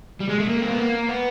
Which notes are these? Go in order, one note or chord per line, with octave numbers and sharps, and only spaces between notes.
G3
G#3
A3
A#3
C4
B3
A#3
B3